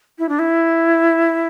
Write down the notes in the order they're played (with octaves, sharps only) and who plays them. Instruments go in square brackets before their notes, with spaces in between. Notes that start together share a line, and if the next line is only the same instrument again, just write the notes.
[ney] E4
D4
E4